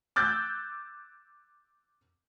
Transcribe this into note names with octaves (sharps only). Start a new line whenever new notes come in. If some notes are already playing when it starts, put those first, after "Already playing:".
D6 E6 F#6 G6 A6